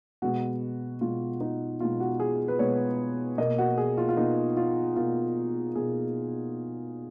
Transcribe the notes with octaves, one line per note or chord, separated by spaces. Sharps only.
B2 G#3 B3 F#4
B2 G#3 B3 F4
D#4
B2 G#3 B3 F4
F#4
G#4
B4
B2 G#3 B3 C#5
B2 A#3 D#5
F#4
G#4
F4
F4
B2 A#3 D#4
F4
B2 A#3 F4
B2 A#3 G#4